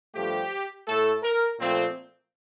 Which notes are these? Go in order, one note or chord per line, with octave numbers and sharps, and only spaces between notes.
G2 F3 A3 G4
A2 A3 A4
A#4
A#2 F3 A3 C4